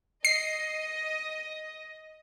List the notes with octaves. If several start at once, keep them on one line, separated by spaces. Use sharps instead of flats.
D#5 C7